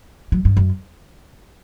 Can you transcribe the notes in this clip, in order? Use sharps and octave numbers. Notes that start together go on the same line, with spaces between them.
F#3
G2
F#2